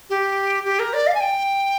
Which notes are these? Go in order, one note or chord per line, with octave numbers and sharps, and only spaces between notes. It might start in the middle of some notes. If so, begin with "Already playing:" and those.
G4
G4
A#4
D5
F5
G#5
G5